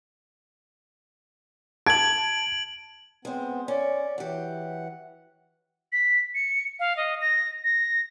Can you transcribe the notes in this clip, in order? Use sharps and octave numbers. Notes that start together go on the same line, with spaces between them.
A5 G#6 D7 F#7
G#3 B3 C4 C5
C#4 D5
E3 F#3 G4 F#5
B6
C#7
F5
D#5
A#6
A#6